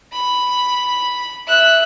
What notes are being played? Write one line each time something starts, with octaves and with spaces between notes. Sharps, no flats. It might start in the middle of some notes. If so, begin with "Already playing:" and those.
B5
E5 F#6